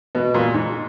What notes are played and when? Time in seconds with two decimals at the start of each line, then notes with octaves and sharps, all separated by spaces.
0.15 B2
0.34 A#2
0.54 G#2